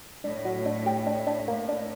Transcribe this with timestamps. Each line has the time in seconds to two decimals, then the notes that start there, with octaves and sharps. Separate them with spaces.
0.24 A2 D4
0.45 F#3
0.66 D4
0.86 G4
1.06 D4
1.27 D4
1.48 A2 A#3
1.69 D4